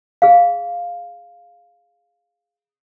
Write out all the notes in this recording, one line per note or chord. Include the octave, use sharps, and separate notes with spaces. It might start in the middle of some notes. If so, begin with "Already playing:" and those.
G#4 F5